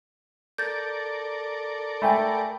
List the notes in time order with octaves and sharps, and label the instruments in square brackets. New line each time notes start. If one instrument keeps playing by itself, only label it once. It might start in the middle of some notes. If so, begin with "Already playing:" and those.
[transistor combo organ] A4 A#4 D5 [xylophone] G6 A6
[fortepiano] A3 [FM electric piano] G5 G#5 B5